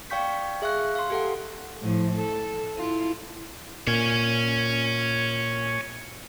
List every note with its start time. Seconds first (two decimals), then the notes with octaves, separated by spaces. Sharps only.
0.10 D5 F5 G5 C#6 G6 B6
0.62 G#4 E5 F5 C#6 F#6
0.95 F5 C6
1.10 G4 A4 F#5
1.81 A2 F3
2.14 A4
2.77 E4 F4
3.87 A#2 C#5 G#5